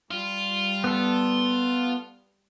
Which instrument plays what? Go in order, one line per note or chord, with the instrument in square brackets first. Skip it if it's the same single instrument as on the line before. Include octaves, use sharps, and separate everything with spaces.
[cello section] G3 [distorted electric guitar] F4
[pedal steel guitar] B3 A4